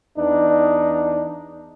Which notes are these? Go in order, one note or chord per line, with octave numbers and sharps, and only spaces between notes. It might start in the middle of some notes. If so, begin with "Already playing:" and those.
E2 D4 D#4